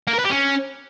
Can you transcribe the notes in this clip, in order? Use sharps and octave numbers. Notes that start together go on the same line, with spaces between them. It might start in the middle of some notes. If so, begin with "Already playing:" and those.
A#3
A#4
B4
G4
C#4